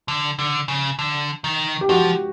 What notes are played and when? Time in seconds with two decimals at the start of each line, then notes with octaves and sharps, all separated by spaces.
0.08 D3
0.39 D3
0.68 C#3
0.99 D3
1.44 D#3
1.81 G4
1.89 F3 F#4